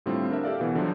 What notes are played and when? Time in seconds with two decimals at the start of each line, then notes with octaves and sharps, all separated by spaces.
0.06 A2 D3 G3 C4 F4
0.30 D4 A#4 E5
0.43 G4 A4 D5 F5
0.60 B2 E3 B3
0.75 D3 F3 F#3